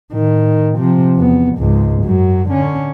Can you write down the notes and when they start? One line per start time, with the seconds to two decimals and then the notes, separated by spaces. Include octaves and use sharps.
0.12 A2 D#3
0.77 C3 F3
1.16 E2 B3
1.57 C#2 G#2
2.03 F#2 F#3
2.49 D3 C#4